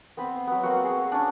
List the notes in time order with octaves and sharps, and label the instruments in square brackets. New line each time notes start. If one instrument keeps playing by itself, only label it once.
[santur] B3 C4 B4 C5
F#3 B3
A#3 C4 F#4
G#4
C#5
C#4 D4